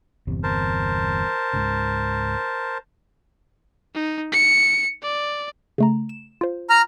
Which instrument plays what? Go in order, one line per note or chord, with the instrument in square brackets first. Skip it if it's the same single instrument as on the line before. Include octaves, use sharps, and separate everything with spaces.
[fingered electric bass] G1 E2 C3
[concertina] A#4 C5 A5
[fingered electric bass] C#2 G#2 C#3
[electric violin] D#4
C#7
D5
[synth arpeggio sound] C#3 A3 A#5
E7
F4 C5
[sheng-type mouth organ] A#5 F6